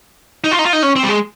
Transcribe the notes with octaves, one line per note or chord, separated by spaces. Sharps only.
D#4
F4
D#4
F4
D#4
C#4
C4
G3
G#3